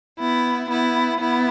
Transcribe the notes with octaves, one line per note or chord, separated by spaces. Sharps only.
B3 E4
B3 E4
B3 E4